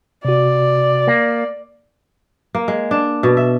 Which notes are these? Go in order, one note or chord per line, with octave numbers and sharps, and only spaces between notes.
C3 F#4 D5
A#3
A#3
G#3
D4
B2
E5